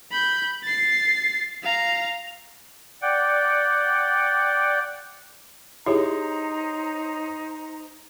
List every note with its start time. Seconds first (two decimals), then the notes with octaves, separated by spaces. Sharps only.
0.11 B5 G6
0.64 A6 C7
1.63 F5 A#5
3.02 D5 F#5 G5
5.86 D#4 E4 G4 G#4 C5 C#5 A#5